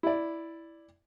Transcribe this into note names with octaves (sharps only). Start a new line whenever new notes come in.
E4 D5